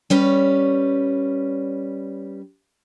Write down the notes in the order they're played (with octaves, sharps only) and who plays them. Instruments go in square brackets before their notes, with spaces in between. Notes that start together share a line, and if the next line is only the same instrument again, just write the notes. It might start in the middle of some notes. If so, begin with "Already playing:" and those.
[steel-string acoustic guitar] G3 C#4 B4 C#5